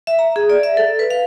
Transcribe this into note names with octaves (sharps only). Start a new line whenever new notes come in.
E5
A#5
G#4
D5
E5
A4
B4
F5